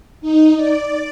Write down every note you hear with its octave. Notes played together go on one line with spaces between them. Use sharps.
D#4
D5